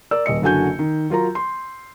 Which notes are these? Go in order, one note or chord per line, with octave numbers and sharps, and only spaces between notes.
A#4 D5 E6
D#1 D#5 C#7
F#1 D3 F#4 G#5 G6
D#3
F#3 F4 A#4 A#5
C6